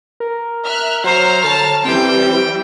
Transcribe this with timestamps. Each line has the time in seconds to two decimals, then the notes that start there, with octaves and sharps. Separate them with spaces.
0.20 A#4
0.64 E5 F6 F#6
1.04 F#3 C5 C#5 A#5 F6
1.44 D3 A5
1.85 E3 G3 C4 G5